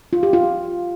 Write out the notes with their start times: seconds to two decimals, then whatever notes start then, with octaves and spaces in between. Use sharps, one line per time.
0.13 F4
0.23 G4
0.33 F4